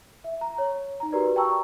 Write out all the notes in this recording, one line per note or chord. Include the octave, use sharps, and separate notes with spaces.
E5
A#5
C#5
D#4 A#5
F#4 G4 A#4 B4 D5
G5 A5 A#5 C#6 E6